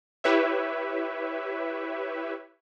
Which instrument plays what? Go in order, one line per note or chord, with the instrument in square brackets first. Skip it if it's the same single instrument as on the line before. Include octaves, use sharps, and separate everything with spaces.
[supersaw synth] E4 G4 B4 C#5 E5